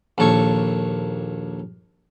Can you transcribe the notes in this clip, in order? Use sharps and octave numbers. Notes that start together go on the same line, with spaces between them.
A#1 D#2 A4 C#5 C#6